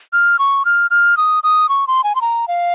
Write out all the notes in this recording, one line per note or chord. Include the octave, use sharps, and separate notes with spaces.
F6
C#6
F6
F6
D#6
D#6
C#6
C6
G#5
C6
A#5
F5